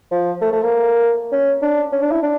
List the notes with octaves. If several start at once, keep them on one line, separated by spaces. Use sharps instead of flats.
F3
A3
A3
A#3
C#4
D4
C#4
D4
E4
D4